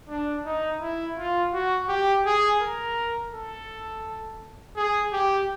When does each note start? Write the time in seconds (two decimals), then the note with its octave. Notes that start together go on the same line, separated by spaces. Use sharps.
0.09 D4
0.45 D#4
0.81 E4
1.18 F4
1.53 F#4
1.88 G4
2.26 G#4
2.61 A#4
3.33 A4
4.76 G#4
5.13 G4